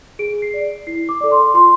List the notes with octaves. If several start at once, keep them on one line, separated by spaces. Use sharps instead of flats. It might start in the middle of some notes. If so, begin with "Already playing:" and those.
G#4 D7
C7
D5
E4 C7
D6
A4 D5
C6
F4 C6